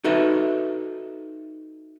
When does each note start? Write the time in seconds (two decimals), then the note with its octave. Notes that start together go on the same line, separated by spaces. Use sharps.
0.04 D#4 F#4 A4 B4 E5